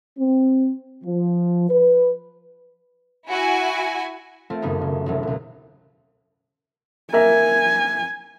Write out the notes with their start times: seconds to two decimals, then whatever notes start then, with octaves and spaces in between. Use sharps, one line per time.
0.18 C4
1.04 F3
1.70 B4
3.28 E4 F#4 G#5
4.50 A3 C4 F4
4.62 D#1 F#2 C#3 B3 D#4
4.81 C#3
5.06 E1 C2 F#3
5.23 C#2 B2
7.13 A#3 A#4 E5 G#5